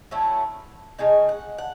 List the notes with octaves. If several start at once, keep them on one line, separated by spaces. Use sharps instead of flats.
F#3 A3 C#4 E4
C#3 G#3 D#4 G#5
F#5
F#5